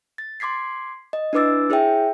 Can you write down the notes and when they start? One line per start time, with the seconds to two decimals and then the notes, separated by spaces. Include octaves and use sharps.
0.18 A6
0.40 C6 D6 G#6 B6 C7
1.13 D#5
1.33 D4 E4 B4 D6 E6 A6
1.70 E4 G#4 C#5 E5 G5